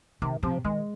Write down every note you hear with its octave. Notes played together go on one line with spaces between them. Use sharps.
C3 D#3
C3 F3
D#3 G#3